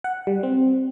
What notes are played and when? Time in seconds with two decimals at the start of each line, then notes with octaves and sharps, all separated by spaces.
0.04 F#5
0.27 G3
0.43 C4